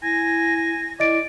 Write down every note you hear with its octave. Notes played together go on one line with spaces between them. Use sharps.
E4 G#5 A#6
E4 D5 D#5 A6 D7